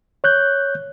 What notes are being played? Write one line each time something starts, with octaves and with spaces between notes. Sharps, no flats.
C#5 F#6 G6